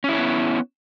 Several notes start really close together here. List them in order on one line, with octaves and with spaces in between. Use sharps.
C#4 E4 C#5 B3